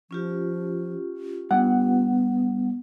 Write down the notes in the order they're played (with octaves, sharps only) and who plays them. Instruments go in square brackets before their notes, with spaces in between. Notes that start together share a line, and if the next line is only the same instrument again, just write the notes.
[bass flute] F3 [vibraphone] C#4 F4 G4
[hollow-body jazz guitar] G2 [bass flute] B3 [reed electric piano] F#5